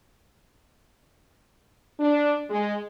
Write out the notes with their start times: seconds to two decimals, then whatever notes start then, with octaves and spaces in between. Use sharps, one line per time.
2.00 D4
2.49 G#3